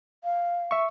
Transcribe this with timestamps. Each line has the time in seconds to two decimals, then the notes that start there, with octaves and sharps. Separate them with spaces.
0.24 F5
0.71 E5 C#6